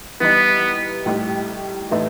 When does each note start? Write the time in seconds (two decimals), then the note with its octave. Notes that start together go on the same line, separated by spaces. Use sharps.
0.20 E3 G3 B3 D#4
1.06 A2 G3 D#4 G4
1.91 A2 E3 A3 D#4